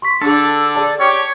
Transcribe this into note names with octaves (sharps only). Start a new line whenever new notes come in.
C6 C#6 B6
D3 D4 G#4 A4
G#4 D5 A5
G4 C#5 G5